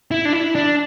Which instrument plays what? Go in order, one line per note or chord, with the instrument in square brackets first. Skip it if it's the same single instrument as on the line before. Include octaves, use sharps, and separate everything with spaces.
[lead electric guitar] E4
D4
E4
D4